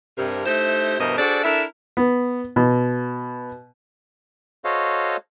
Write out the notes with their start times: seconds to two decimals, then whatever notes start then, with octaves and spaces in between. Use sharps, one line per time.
0.17 G2 C3 A#4
0.45 A3 D#4 E4 G4 C5
1.00 G2 B2 E3 A#4 C5 D#5
1.18 D4 F#4 G#4 A4 C5 D5
1.43 D4 E4 A4 A#4 E5
1.97 B3
2.56 B2
4.65 F#4 A4 C5 C#5 D#5 F5